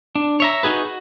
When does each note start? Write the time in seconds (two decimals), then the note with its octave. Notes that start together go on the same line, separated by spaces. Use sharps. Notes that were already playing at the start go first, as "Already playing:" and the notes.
0.15 D4
0.40 C#5 E5 A#5
0.63 D#4 F#4 G#4 B4
0.85 F#4